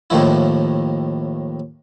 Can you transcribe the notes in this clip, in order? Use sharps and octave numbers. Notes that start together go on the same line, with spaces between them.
D#2 A2 D#3 F3 E4